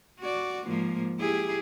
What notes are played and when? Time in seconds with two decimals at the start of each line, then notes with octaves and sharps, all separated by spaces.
0.20 F#4 D5
0.67 G#2 F3 A#3
1.19 E4 G4 G#4